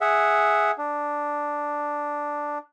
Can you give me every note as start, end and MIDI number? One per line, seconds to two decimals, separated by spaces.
0.01 0.71 68
0.01 0.71 76
0.01 0.71 78
0.78 2.58 62